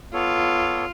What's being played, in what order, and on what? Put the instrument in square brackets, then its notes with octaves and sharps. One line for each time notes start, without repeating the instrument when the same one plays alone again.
[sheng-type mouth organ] B3 A4 C#5 [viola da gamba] F4